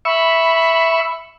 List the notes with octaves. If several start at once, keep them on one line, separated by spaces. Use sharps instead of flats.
E5 B5 C#6